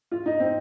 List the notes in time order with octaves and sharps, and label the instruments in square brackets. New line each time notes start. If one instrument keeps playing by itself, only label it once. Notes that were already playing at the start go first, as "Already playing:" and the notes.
[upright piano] F4
D#4
C4